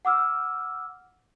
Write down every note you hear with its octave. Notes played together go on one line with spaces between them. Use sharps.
F#5 D6 E6 F6